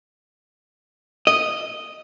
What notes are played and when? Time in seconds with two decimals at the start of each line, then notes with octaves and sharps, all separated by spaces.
1.27 D#5